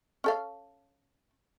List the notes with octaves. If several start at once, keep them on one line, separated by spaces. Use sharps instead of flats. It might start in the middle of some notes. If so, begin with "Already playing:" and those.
C#4 A4 F5